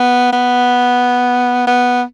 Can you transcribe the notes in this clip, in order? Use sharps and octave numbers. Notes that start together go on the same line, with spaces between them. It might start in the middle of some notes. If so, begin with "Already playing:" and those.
Already playing: B3
B3
B3